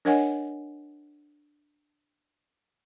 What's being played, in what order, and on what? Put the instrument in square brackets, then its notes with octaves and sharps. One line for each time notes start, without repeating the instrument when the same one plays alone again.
[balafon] D4 A#4 C#5 D#5 F#5 G#5